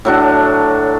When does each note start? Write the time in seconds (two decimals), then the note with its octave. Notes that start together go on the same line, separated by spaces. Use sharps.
0.05 A2 F#3 D4